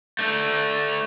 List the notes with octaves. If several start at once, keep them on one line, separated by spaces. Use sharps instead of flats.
A3 D4